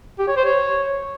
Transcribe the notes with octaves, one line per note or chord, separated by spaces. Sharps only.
G4
C#5
C5
C#5